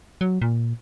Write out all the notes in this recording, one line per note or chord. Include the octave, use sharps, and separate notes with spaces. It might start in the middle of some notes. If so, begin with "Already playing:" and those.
F#3
A#2